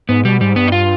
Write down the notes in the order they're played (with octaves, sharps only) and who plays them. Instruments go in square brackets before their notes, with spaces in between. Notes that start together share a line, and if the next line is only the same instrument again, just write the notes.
[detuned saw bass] G#2 [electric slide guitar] B3
[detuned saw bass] B2 [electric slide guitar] G3
[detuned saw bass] G#2 [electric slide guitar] G3
[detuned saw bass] G2 [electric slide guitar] B3
[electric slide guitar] D#4
F4